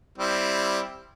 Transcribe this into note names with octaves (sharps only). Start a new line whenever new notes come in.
G3 C4 E4